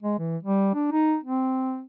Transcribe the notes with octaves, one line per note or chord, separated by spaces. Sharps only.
G#3
E3
G3
D4
D#4
C4